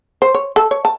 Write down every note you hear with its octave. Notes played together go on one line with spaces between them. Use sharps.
C5
C#5
A4
C#5
A5